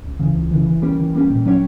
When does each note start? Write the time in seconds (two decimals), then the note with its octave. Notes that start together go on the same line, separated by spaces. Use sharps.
0.04 C#2
0.19 C#3 E3
0.35 C#2
0.51 C#3 E3
0.67 E3
0.82 G3 A#3 C#4 G4
0.98 E3
1.13 G3 A#3 C#4 G4
1.30 A#2
1.46 F#3 C#4 G4 C#5